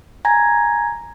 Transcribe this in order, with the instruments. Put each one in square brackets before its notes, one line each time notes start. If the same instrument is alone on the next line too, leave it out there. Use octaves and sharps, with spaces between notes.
[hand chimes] G#5 A#5 G#6 A#6